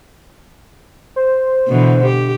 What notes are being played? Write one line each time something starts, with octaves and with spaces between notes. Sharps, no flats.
C5
B2 D3 E3
G4